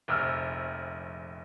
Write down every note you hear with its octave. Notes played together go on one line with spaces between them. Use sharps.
F1 A#1 E6 F6